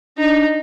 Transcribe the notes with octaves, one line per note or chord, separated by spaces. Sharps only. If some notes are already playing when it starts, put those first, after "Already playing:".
D4 D#4